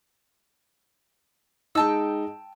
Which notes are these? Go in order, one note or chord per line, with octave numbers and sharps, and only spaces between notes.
G#3 D#4 G5 A5 E6